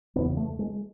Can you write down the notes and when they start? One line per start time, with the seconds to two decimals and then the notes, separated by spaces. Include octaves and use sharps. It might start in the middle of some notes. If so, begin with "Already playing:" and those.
0.16 E2 C#3 B3
0.37 A3
0.59 G#3